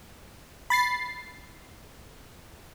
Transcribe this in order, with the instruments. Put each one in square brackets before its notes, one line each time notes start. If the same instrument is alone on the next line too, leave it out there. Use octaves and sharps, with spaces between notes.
[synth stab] B5 A6 C7